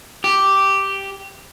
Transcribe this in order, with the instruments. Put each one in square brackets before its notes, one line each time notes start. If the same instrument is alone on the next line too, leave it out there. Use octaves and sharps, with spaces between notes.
[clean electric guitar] G4